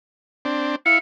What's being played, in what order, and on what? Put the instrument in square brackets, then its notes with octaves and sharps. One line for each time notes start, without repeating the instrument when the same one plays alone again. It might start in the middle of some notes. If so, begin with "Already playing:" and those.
[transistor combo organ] C4 D4
[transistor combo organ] E4 F5 [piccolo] C#7